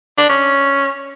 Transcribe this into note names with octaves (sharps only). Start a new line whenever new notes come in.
D4
C#4